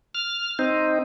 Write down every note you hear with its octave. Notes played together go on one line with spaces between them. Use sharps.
F6
C4 D#4